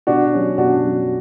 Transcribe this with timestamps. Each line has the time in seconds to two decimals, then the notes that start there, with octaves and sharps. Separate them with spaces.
0.07 B2 D4 F#4
0.33 F#3 C#4
0.58 B2 D4 F#4
0.84 F#3 C#4